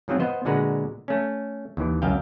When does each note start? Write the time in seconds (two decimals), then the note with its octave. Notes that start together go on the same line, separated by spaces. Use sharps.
0.08 G#2 F3 F#3 C4 F4
0.20 B3 C5 D#5
0.45 A#2 D3 G#3 F#4 B4 A#5
1.08 A3 C#4
1.77 D#2 E3
2.02 C#2 F#2 F5 G5